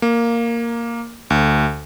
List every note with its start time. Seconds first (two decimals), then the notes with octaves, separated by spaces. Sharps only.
0.02 A#3
1.30 D2